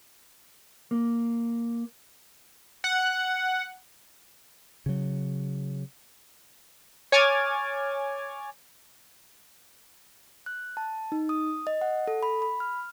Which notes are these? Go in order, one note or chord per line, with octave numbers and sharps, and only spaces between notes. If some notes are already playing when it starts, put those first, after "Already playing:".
A#3
F#5
C#3 F#3
C#5 G#5 D6 F6 G#6 A6
F#6
A5
D#4
D#6
D#5
F#5
A4
B5
B5
F6